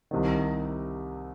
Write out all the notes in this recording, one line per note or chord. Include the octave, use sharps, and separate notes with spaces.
C2 C3 D#3